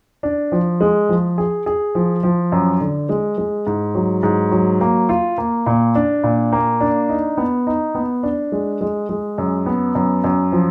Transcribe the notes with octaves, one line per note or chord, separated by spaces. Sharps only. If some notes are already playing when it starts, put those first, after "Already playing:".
D4
F3
G#3
F3
G#4
G#4
F3
F3
F#2
D3
G#3
G#3
G#2
F#3
G#2
F#3
A#3
F4
A#3
A#2
D4
A#2
A#3
D4
D#4
B3
D#4
B3
D4
G#3
G#3
G#3
F#2
B3
F#2
F#2
F3